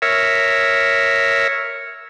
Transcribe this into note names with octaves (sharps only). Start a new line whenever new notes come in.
A#4 C#5 E5